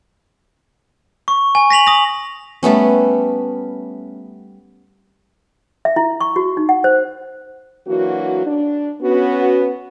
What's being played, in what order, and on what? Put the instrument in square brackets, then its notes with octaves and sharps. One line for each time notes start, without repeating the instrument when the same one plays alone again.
[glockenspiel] C#6
G#5
A#6 B6 F7 F#7
D#6 A#6
[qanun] G3 A3 B3 C#4
[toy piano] E5
E4
C#6
F#4
D#4
F#5
C5
[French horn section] E3 F#3 A#3 D4 F#4
D4
B3 C#4 F#4